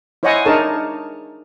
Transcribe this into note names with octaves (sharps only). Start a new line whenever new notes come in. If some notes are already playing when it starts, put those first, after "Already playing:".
E4 C5 C#5 D#5 F#5 G#5
D4 D#4 G#4 A#4 C#5 A5